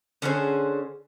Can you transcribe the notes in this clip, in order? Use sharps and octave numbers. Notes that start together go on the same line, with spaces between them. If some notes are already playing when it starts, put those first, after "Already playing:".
D3 C#4 G#4 C5